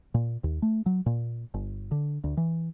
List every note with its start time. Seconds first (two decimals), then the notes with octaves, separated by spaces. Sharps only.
0.14 A#2
0.44 D#2
0.62 A3
0.86 F#3
1.06 A#2
1.54 G1
1.91 D3
2.24 D2
2.37 E3